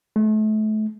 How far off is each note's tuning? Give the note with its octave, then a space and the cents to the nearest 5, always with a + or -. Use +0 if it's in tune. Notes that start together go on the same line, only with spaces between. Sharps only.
A3 -35